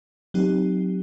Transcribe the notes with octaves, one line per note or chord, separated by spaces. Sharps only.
F#3 C4 D#4 G4